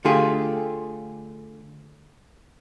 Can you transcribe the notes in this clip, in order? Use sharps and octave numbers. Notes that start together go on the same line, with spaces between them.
D3 A3 F4 G4 G#4